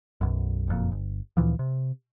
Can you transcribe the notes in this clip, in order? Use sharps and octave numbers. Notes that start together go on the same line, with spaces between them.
B1 F#2
F#1 F2 A#2
G1
D2 A#2 E3 F3
C3